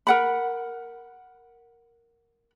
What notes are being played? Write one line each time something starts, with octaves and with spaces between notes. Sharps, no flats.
A#4 F#5 B5